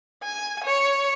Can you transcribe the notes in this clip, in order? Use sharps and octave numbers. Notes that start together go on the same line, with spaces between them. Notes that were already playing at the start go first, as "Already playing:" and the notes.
G#5
C#5